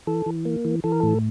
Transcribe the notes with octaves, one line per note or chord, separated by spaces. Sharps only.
E3 A4
E3
A#3
E3
E3 A4
A#4
A2 A4